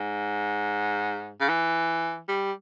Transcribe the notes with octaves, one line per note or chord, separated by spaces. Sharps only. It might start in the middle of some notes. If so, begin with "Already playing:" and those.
Already playing: G#2
C#3
E3
G3